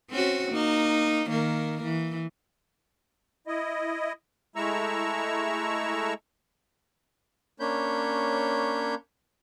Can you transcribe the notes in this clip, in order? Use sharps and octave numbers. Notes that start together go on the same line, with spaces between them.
C4 C#4 F#4
A#3 D#4
D#3 A#3
E3
E4 D#5
G#3 A3 E4 A#5 C#6 E6
A#3 C#4 D4 C#5 B5 G6